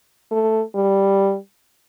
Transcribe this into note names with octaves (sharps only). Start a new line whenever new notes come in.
A3
G3